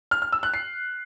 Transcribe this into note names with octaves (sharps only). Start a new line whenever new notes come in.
F6
F6
E6
F#6
C7